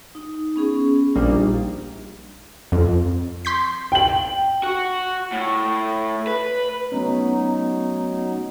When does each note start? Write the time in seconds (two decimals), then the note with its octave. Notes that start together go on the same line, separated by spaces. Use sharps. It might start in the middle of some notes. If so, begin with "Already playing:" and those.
0.15 D#4
0.56 B3 C#4 G#4
1.16 A#1 G3 A#3 D4 D#4
2.72 F2
3.45 C6 G6 B6
3.92 G5 F#7
4.63 F#4
5.33 A2
6.27 B4
6.92 F#3 A3 B3 C#4 D#4